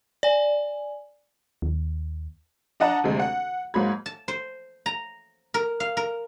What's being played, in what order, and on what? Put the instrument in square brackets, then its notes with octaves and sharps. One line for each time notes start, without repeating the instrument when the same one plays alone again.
[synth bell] D5 G#5
[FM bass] D#2
[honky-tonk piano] D4 D#5 F#5 A5 A#5
D2 C3 G#3
F#5
G#2 F#3 A#3 B5 G#6
[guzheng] A5
C5
A#5
A#4
F5
A#4